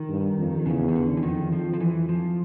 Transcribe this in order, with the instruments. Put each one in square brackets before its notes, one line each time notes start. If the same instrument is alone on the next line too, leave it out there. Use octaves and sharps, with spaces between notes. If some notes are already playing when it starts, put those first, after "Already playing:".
Already playing: [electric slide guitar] D#3
[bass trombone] G2
F2
[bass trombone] E2 [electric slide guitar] C#3
[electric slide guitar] D#3
D3
E3
[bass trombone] F2 [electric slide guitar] D#3
[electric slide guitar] F3
F3
E3
F3